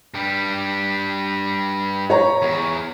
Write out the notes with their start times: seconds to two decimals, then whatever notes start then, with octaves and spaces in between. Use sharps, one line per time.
0.14 G2 G3
2.10 C#5 A#5
2.42 E2